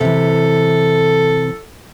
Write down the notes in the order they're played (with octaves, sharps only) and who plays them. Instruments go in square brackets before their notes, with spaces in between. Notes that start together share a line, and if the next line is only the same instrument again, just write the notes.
[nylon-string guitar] C3 E3 [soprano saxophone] A4